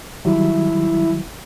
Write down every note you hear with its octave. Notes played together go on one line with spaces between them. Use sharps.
D#3 F#3 G3 E4